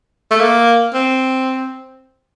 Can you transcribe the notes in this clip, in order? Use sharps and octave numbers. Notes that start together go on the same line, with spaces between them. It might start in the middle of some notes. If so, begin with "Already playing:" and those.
A3
A#3
C4